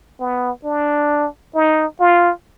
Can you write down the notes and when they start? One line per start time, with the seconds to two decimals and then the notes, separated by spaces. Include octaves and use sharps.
0.20 B3
0.64 D4
1.55 D#4
2.00 F4